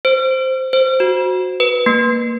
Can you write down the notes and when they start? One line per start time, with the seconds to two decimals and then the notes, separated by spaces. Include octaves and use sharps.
0.05 C5
0.73 C5
1.00 F#4
1.60 B4
1.86 A#3